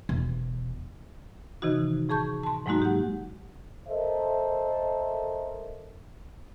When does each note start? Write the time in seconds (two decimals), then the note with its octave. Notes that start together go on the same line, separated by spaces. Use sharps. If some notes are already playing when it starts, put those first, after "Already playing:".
0.09 E1
1.62 C3 D#3 E3 D#4 F#4
2.09 A2 G#4 A5 C#6 G6
2.43 A5 C6
2.66 G#2 F#3 G#3 A#3 D#4 F#4
2.82 G4 F#5
3.88 A4 A#4 C5 D#5 E5